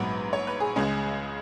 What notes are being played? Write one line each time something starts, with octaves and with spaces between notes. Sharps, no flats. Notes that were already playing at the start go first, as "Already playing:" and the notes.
Already playing: A#1 G#2 F#3 B3 B4
C#5
B4
G#4
C#2 C#3 G#3 C#4